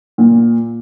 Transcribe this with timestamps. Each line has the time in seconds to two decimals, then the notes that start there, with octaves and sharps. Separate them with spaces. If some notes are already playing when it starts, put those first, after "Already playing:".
0.18 A#2